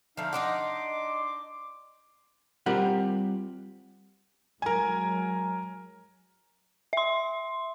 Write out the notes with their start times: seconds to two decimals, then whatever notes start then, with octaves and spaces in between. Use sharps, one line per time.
0.17 D3 F3 A3 D#4 F5
0.33 D4 D#4 D#5 F#5 C6 D6
2.66 G3 C4 F4 G4 A#4 F#5
4.62 F#3 G#3 A#4 G#5
6.93 E5 C6